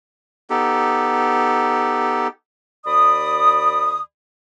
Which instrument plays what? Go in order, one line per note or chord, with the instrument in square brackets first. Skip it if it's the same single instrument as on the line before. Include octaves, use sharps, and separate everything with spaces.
[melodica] B3 D#4 G4 A4
[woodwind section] D#2 D5 B5 D#6